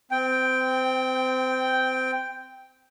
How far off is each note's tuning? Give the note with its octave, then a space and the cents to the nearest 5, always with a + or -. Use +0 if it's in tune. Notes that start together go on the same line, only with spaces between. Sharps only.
C4 -25 G5 +0